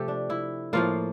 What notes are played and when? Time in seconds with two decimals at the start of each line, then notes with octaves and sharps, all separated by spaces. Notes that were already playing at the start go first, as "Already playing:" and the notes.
Already playing: C3 F3 A3 G4 A4
0.08 D4
0.30 E4
0.73 A2 F3 A#3 F4